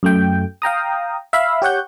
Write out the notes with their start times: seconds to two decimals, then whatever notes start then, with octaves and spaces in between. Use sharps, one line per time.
0.03 F#2 A3 G5
0.62 F5 G5 A#5 D#6
1.33 E5 F5 B5
1.62 G4 C#5 F#5 G6